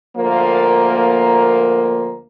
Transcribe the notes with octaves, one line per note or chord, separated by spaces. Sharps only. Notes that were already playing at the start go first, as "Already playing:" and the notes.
D2 F3 A#3